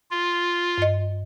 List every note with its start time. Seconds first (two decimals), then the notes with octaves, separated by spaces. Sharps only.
0.11 F4
0.78 G2 D#5